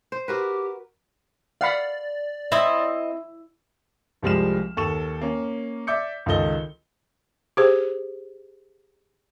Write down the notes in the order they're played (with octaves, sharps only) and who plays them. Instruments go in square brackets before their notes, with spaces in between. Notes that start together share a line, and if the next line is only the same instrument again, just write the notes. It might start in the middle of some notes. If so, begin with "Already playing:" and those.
[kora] C5
[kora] F#4 A#4 B4 [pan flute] G4
[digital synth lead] D5 [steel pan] F5 F#5 B5
[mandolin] C4 D#5 [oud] E4
[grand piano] C2 F3 G3 G#3 F6 E7
D#2 A4 C#6 E7
A#3 C#4
D5 E5 D6 G6 C#7
C#2 D#3 F4 A4 D#5 G7
[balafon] G4 G#4 C5